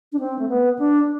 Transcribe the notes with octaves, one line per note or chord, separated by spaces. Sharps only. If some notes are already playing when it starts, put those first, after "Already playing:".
D4
C4
A3
B3
D4